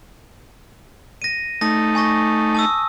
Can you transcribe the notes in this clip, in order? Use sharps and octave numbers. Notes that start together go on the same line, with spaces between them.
A#6 D#7
A3 D#4 A#6
G#5 C#6 A#6
A5 D#6 E6